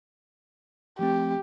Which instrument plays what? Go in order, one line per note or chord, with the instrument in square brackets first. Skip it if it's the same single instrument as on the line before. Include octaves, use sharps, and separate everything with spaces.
[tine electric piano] F3 A3 C4 [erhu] G4